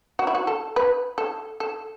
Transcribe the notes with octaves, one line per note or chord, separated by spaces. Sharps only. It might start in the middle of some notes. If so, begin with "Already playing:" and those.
F#4
E4
F#4
A4
B4
A4
A4